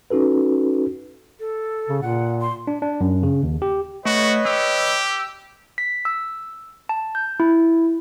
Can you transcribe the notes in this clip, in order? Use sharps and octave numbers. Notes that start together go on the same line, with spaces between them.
C#4 D#4 F#4 A4 B4
A4
C#3
A#2 F#5
C6
D4
D4
F#2
C#3
D#2
G4
A3 F#4 B4 C#5 D#5
G4 E6
B6
E6
A5
G6
E4